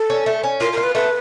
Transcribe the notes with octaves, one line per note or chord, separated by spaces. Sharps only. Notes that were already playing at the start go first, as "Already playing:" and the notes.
Already playing: A4
C#4
A3
C#4
F4 A#4
A#4
F4
B4
A3 B4